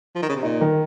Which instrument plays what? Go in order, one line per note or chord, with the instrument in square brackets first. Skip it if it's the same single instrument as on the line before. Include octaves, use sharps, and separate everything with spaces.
[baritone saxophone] F3
D#3
C#3
C3
[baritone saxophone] A#2 [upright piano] D#4
[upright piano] D#3